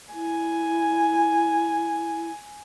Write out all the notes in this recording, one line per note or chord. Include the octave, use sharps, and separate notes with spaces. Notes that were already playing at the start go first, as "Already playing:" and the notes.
E4 G#5